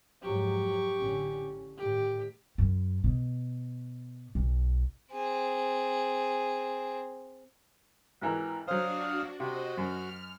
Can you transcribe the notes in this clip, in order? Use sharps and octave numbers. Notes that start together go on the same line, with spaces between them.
F2 G#2 F#3 G4 C#6
A1 D3 C#4
A2 D#3 G4
F#2
B2
B1
C4 G#4
G#1 E3 A#4
F#3 D4 F#4 C5 F5 D#6 F6
C3 F#4 C5 D#5
F#2 F6